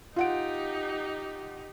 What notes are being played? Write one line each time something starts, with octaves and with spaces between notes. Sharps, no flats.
D#4 F4 G4 F#5 D7